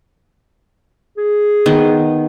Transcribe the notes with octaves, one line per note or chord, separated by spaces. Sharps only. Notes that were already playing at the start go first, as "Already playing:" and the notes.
G#4
D#3 B3